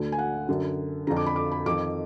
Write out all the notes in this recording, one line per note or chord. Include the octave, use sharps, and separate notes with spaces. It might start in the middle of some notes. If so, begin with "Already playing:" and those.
Already playing: D2 D3
G#5
F#5
F#2 D3
F2 D3 A#5
D6
B5
D6
B5
F2 D#3 D6